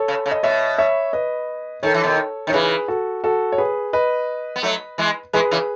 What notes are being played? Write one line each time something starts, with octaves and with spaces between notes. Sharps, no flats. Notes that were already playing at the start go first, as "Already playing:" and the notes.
Already playing: A4 C#5
C#3
C#3
D#5
B2 C#5 E5
C#5 E5
B4 D#5
D#3 A4 C#5
E3
B2 D#3
D#3
C#5
C#3 E3 G#4 B4
F#4 A4
F#4 A4
C#5
G#4 B4
B4 D#5
B3
F#3 A3
E3 G#3
E3 G#3 G#4 B4
C#3 E3